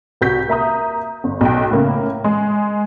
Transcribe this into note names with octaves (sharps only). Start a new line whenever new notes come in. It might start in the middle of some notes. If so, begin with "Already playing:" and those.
C2 F#4 G6 B6
A#3 E5 A#5 D#6
G1
B1 G5
A2 C#3 A#3
G#3